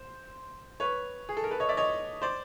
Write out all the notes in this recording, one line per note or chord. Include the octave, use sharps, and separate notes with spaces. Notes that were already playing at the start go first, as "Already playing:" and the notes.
Already playing: C5
B4 C#5
G#4
A4
A#4
A4 B4
C#5 D#5
D5 E5
C#5 D#5
C5 D5